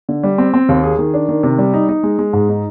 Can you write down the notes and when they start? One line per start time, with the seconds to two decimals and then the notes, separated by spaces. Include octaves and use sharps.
0.09 D3
0.23 G3
0.38 C4
0.54 C4
0.69 D#2
0.84 G#4
0.99 D#3
1.13 D4
1.29 D#3
1.43 C3
1.58 G3
1.74 D#4
1.89 D#4
2.03 G#3
2.19 G#3
2.33 G#2
2.49 D#4